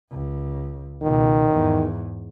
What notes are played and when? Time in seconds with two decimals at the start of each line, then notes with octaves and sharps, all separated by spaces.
0.12 C#2
1.02 C#2 B2 D#3
1.50 E2 G#2